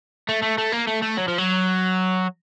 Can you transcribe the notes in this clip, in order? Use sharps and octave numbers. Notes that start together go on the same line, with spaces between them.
A3
A3
A3
A#3
A3
A3
F#3
F3
F#3